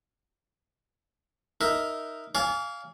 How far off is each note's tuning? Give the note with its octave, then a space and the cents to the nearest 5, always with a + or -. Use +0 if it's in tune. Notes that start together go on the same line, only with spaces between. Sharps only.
D#4 +0 A#4 +0 E5 +0
D5 -45 F5 +0 G#5 +0